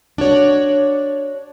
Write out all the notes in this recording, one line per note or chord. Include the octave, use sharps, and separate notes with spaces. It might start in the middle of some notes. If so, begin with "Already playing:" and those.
D4 F#4 C#5 D5